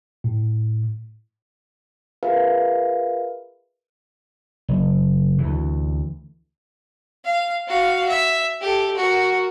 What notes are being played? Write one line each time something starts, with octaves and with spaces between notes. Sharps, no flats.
A2
F4 G#4 A#4 B4 E5 F5
F#1
D2 E3
F5
F#4 F5
E5
G4 A4
F#4 A#4